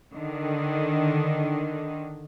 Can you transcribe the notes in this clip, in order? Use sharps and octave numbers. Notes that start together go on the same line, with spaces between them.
D3 D#3